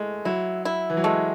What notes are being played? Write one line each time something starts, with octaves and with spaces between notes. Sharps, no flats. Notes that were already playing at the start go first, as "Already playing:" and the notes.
Already playing: G#3 A3
F#3 E4
E4
E3
F#3
G#3 A3